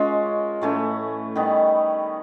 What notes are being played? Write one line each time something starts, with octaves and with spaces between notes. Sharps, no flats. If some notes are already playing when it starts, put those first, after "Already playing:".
Already playing: G#3 C#4 F4 A#4
A2 E3 A3 C#4
D#3 G3 B3